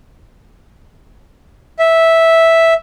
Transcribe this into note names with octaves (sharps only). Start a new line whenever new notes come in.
E5